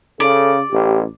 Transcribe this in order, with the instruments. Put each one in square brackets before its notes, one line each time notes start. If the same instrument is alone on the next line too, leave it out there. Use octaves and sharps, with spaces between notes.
[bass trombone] C#3 [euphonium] A4 [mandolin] D5
[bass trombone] A1 [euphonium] G4